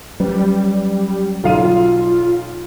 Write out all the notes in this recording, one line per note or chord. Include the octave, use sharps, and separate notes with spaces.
F#3 G3 C#4 B4
B1 F4 F5 D#7